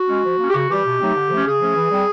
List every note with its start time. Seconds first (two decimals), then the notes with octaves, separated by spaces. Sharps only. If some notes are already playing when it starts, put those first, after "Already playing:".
Already playing: F#4
0.08 G#3 C#4
0.24 F3
0.39 A#3
0.44 C#4
0.50 G4
0.54 C#3 F#4
0.69 E3 G3 G4
0.85 B2
1.00 F#3 A3 C4 D#4
1.15 D3
1.30 F3 A3 C#4
1.46 C#3 G#4
1.61 F3 A3 C#4
1.76 E3
1.91 G3 C4